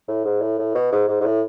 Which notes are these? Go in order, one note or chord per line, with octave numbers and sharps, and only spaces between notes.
A2
G#2
A2
A2
B2
G#2
G#2
G#2
A2